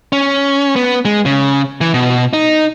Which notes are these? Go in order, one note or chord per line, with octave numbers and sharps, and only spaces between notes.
C#4
B3
G#3
C#3
E3
B2
D#4